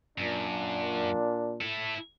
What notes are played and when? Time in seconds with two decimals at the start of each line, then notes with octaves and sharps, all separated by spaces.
0.18 F#2 A#2 D4
1.61 E4 A4